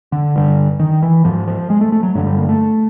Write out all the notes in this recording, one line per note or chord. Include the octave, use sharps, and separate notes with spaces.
D3
G2 D3
D#3
E3
G#2 F3
F3
G#3
A3
A3
F#3
G2 D3 F#3
G3
A#3
A3